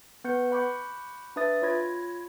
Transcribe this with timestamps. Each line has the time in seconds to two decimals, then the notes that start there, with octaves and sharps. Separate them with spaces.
0.24 B3 B4 G6 C#7
0.51 F#5 B5 C#6 D6 G6
1.36 D4 B4 E5 D#6 A6
1.62 F4 C#5 B5 G#6 A#6